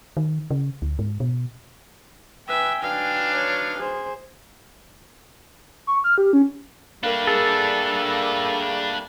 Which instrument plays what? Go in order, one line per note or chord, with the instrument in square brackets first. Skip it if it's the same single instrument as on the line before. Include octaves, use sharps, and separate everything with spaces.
[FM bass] D#3
C#3
D2
G#2
B2
[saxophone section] B4 [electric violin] E5 [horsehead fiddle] G5 G#5
[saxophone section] F#3 D#4 B4 [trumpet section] D4 [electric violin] F5
[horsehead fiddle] C#5
G#4 C5
[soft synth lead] C#6
F6
G4
C#4
[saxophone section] G3 A3 A#3 [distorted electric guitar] D4 B4 [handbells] A#4 F5
[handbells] G#4 [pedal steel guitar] A4